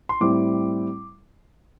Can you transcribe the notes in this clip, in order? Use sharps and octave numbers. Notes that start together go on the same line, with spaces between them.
C6
A2 G3 C4 E4 D6